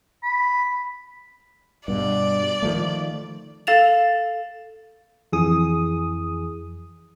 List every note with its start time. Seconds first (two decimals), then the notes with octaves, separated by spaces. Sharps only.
0.23 B5
1.88 G2 B2 D5
2.62 D#3 F3 A3
3.67 A4 F5 A6 E7 F7
5.32 F2 E3 G#4 D#6